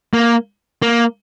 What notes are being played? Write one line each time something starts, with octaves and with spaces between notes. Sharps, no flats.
A#3
A#3